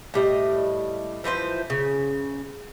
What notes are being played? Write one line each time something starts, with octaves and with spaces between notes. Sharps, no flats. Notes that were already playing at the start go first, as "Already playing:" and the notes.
A2 G3 D#5
E3 F3 B4 C5
C#3